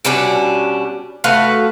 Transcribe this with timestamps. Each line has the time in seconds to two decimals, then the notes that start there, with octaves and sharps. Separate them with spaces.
0.05 B2 G3 C#4 D4
1.24 A3 F#4 B4 F5